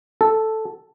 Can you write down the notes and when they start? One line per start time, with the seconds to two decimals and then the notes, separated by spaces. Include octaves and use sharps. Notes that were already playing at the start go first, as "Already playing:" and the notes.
0.21 A4